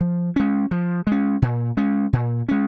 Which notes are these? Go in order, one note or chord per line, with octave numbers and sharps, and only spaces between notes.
F3
G#3 C#4
F3
G#3 C#4
A#2
G#3 C#4
A#2
G#3 C#4